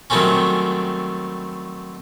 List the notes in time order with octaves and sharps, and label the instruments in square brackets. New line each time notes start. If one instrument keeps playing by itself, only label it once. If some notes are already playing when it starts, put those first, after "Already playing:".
[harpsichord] D#3 F#3 G3 A3 C4 C#4